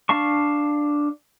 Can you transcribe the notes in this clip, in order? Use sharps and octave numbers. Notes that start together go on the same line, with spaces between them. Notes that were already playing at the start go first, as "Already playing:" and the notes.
D4 F5 A5 C#6